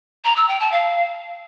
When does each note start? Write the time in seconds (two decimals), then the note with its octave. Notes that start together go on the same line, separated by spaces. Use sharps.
0.25 A#5
0.36 E6
0.48 G5
0.60 A5
0.72 F5